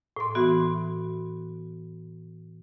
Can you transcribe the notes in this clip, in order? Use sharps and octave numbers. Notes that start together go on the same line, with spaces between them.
A2 C6
E3 B3 F#4